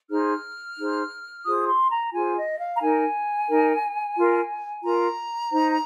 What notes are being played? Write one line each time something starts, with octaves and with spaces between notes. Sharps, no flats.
D#4 G#4 C5 F6
D#4 G#4 C5
F4 G#4 C5 D#6
C6
A#5
F4 G#4 C5 G#5
D#5
F5
A#5
D#4 A#4 G#5
D#4 A#4
F4 A#4
F4 A#4 A#5
D#4 C5